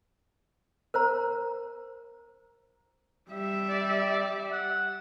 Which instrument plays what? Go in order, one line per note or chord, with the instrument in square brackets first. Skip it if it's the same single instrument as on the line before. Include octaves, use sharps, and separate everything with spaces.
[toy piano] A#4 C5 A#5
[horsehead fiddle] G3 E5
[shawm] D5
F#5